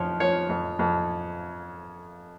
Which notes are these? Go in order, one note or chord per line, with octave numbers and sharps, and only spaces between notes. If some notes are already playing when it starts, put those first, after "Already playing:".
Already playing: F2 F3 C#5
F3 C#5
F2
F2